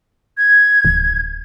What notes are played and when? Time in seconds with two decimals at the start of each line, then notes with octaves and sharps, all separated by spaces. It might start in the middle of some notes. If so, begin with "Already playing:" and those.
0.38 G#6
0.85 D1